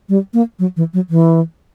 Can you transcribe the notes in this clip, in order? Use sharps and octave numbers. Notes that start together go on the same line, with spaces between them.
G3
A#3
F#3
E3
F#3
E3